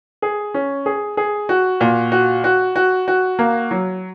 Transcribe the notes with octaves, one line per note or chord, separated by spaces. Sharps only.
G#4
C#4
G#4
G#4
F#4
A#2
F#4
F#4
F#4
F#4
A#3
F#3